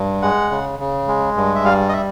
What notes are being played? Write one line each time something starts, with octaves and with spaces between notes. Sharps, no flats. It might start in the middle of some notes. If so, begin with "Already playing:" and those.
Already playing: G2
G#3 F#5
C#3
C#3
G#3
G2
E5
G3 F5
D#5
E5